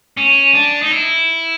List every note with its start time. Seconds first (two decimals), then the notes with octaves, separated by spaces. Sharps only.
0.17 C#4
0.55 D4
0.82 D#4
0.91 E4